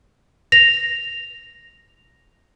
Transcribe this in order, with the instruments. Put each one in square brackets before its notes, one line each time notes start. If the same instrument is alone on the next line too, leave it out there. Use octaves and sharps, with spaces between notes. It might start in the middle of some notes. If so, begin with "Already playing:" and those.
[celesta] A#6 F7